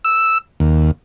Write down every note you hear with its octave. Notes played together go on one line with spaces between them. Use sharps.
E6
D#2